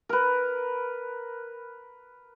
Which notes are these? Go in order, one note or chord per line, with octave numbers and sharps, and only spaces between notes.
A#4 B4